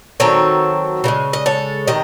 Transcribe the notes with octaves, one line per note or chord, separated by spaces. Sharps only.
D#3 F#3 C4 A4 C#5
C#3 E3 G#3
D#5
A4 C#5
C3 D#3 D#5